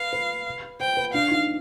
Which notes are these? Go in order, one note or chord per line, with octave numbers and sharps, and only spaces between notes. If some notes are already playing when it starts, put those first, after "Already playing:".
Already playing: B4 F5
B4
C5 G5
B4
D4 F5
D#4